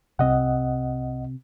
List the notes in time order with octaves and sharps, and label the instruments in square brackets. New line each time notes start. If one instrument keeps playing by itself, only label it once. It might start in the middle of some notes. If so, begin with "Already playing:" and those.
[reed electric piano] C2 D#5 F#5 [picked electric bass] C3 C4